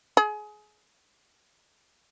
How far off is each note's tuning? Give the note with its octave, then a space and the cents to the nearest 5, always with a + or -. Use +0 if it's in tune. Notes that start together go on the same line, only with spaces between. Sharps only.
G#4 +25